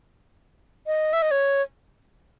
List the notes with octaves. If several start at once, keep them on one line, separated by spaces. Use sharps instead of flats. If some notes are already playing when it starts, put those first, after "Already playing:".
D#5
E5
D#5
C#5